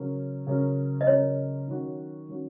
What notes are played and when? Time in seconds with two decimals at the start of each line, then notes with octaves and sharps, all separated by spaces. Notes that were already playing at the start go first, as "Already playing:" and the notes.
Already playing: C#3 F#3 C#4 A#4
0.47 C#3 F#3 C#4 A#4
1.01 D#5
1.07 C#3 F#3 C#4 A#4 C#5
1.68 D#3 F#3 C#4 F#4
2.28 D#3 F#3 C#4 F#4